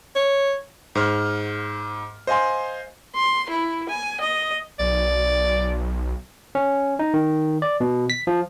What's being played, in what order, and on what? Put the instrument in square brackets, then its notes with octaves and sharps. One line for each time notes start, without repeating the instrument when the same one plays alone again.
[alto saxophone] C#5
[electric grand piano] G#2 C5 F6
C5 D#5 F5 G#5 C6
[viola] C6
E4
G#5
D#5
[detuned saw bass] B1 [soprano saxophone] D5
[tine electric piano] C#4
D#4
D#3
D5
B2
B6
F3